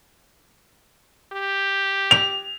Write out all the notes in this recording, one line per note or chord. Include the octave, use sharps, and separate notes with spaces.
G4
F7